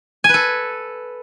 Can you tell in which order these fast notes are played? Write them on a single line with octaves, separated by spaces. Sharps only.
G#5 B4 A4